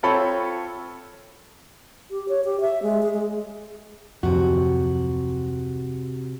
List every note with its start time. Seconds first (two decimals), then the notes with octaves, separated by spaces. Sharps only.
0.03 C4 F4 A4 C#5 B5
2.11 G4
2.29 C#5
2.44 G4
2.61 E5
2.83 G#3
3.02 G#4
3.14 G#3
4.23 D1 F2 C3 F#4